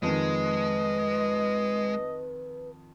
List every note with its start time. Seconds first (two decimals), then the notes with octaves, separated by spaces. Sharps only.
0.03 F2 D#3 G#3 B4 D#5